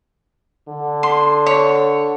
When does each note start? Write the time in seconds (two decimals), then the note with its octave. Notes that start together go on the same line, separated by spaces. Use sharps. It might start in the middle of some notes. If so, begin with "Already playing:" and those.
0.68 D3
1.03 C6
1.46 C#5